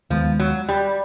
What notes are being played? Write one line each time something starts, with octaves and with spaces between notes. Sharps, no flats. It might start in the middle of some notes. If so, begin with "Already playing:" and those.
D#2 D#3 F3 G#3 B3
F#3
G3